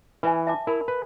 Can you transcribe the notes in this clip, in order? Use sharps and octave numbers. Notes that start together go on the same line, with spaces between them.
E3 B4 E5 G#5
E5 A5 D6
E4 A#4 B5
B4